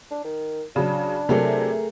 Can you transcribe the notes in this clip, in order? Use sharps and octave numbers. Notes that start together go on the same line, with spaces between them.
D4
D#3
C#3 F#3 D4
C3 F#3 A3 G#4 A#4